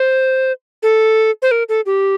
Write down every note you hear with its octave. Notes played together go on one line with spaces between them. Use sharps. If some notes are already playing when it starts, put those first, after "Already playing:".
Already playing: C5
A4
C5
A#4
A4
G4